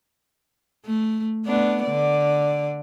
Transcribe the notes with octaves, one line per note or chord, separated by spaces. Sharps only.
A3
A3 B3 D4
D3 D5